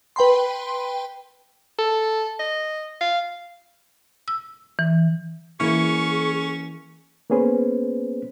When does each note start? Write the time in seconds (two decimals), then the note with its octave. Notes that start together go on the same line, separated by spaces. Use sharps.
0.16 B4 G5 B5 C6
1.79 A4
2.40 D#5
3.01 F5
4.28 E6
4.79 E3
5.60 E3 A#3 C#4 E4 G#4 C#6
7.30 A#3 B3 C#4 G#4 B4 C5